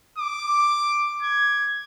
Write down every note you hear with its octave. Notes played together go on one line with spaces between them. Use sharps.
D6
G#6